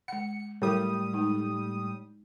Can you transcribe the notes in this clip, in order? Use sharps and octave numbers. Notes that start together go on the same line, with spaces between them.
G#3 F#5 C#7
A2 F#3 G3 E4 A#4 D#6
G#3 D#4